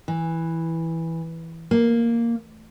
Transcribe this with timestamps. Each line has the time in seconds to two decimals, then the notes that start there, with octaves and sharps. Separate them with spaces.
0.08 E3
1.71 A#3